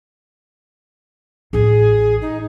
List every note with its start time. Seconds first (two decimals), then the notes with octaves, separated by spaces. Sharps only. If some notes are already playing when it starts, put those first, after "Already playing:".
1.53 A1 F4 G#4
2.22 D#4